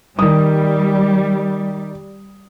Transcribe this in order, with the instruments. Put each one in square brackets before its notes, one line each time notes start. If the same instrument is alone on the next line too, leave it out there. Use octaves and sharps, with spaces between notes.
[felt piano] D#3 D#6 [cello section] G3